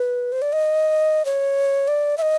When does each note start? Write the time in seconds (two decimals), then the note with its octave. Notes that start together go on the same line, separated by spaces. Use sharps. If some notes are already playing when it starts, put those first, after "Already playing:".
Already playing: B4
0.32 C5
0.42 D5
0.53 D#5
1.25 C#5
1.88 D5
2.18 E5
2.22 D#5